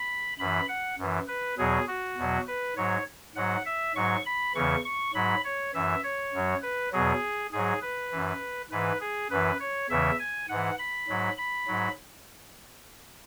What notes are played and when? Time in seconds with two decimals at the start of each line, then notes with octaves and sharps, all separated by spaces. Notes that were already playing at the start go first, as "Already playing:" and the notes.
Already playing: B5
0.39 F#2 E3 B5
0.69 F#5
0.98 F#2 E3
1.28 B4
1.58 E2 B2 F#3 G#4
1.87 F#4
2.17 E2 B2 F#3
2.47 B4
2.77 G#2 F#3 C#5
3.36 G#2 F#3 F#5
3.66 E5
3.95 G#2 F#3 C#6
4.26 B5
4.55 E2 C#3 E3 C#6
4.85 C#6
5.14 G#2 F#3 B5
5.44 C#5
5.74 F#2 E3 E5
6.03 C#5
6.33 F#2 F#3
6.62 B4
6.92 E2 B2 F#3 G#4
7.52 G#2 F#3 G#4
7.82 B4
8.12 F#2 E3
8.71 G#2 E3 B4
9.01 G#4
9.30 F#2 E3 B4
9.60 C#5
9.90 E2 C#3 E3 E5
10.19 G#5
10.49 G#2 E3 F#5
10.78 B5
11.08 G#2 F#3
11.38 B5
11.68 G#2 F#3